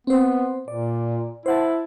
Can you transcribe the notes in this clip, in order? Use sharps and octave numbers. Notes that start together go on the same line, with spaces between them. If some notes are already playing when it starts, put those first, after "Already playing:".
B3 C4 C5
A#2 D5
E4 C5 F#5 A5